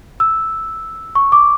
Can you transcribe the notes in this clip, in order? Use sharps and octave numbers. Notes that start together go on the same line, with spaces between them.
E6
C#6
D6